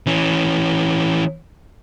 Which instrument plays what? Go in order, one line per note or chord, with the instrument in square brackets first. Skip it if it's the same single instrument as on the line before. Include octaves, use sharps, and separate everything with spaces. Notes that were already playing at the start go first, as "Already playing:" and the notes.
[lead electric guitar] E3 C#4